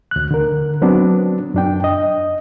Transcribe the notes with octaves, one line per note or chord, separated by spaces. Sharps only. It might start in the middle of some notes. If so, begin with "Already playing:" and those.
D2 F#6
D3 A#4
F#3 B3 C4 D4
F#2 D4 G5
D#5